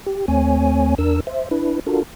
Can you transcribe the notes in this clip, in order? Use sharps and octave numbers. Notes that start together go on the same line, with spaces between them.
G4
D#2 A3 C4 C#5 G#5
E2 D4 A#4 E6
C5 E5
D4 E4 B4
D4 F4 F#4 A4 A#4